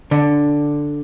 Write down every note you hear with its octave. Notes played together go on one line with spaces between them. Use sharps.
D3